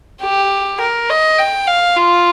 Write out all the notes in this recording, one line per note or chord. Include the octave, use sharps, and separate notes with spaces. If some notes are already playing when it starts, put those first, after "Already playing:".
G4
A#4
D#5
G5
F5
F4